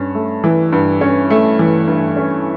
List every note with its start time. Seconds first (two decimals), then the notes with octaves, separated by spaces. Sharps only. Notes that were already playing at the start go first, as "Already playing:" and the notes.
Already playing: G2 C#4
0.15 A3
0.44 E3
0.72 G2
1.01 C#4
1.30 A3
1.59 E3
1.88 G2
2.16 C#4